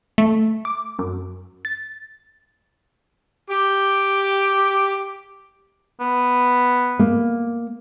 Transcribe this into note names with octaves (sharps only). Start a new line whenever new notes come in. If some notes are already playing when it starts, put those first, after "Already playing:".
A3
D6
F#2
A6
G4 D6
B3
A#3